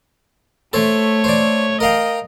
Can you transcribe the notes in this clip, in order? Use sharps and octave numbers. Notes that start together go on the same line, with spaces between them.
A3 A4 C5 C#5
C5 D5
A#4 D#5 F5 G5